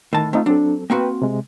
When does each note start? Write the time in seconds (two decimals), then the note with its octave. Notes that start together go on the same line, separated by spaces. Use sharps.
0.13 A2 D#3 A5
0.33 A3 C4 D#4 F4
0.46 F#3 C4 D4 A4
0.90 A#3 C4 F#4 B4 G5
1.22 C3 G#3